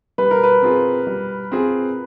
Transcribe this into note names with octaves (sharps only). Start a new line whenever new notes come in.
G3 B4
A#4
B4
C4 F4 G#4
G3
C4 F4 G#4